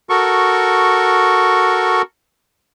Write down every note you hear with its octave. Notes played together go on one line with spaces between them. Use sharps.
F#4 A4 A#4 C#6